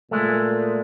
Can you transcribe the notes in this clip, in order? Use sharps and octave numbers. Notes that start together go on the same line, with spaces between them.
A#2 G#3 A3